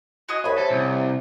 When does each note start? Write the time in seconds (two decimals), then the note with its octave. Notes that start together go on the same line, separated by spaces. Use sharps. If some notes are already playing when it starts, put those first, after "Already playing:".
0.29 F#4 G#4 D#5
0.44 C2 C5 C#5 G#5 B5
0.58 C3 A4
0.70 C2